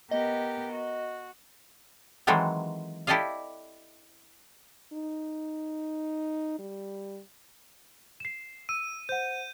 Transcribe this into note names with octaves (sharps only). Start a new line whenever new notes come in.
B3 G4 A#4 D#5
F#4
D#3 E3 F#3 G#3 C4 A4
E4 G4 A4 D5 D#5 F5
D#4
G3
C7 E7
E6 D#7
C5 F#5 G6